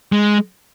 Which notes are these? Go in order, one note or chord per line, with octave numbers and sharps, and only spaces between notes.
G#3